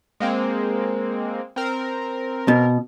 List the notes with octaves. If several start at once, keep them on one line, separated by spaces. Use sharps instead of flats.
G#3 A#3 C4
C4 A#4
B2